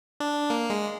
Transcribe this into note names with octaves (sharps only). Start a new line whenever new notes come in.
D4
A#3
G#3